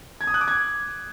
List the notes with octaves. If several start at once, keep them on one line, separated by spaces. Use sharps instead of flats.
G#6
D#6
F#6
D6
G#6